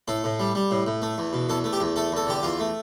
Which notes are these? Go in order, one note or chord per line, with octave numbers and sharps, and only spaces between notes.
A2 A4
A2
G3
G3
A2
A2
A3
E2
B2
E2 A4
A3
G4
E2
A3 A4
E2 A4
D3 G4
E2 F4
A3